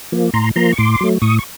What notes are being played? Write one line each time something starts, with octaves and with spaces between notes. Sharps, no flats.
F3 A#3
A2 A#5 C6
F3 A#3 A#5 C6
C#6
A2 C6 D6
F#3 A3
A2 C#6 D#6
C#6